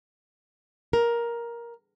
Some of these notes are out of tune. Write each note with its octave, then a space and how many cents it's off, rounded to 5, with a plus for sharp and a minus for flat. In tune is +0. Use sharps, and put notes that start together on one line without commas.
A#4 +10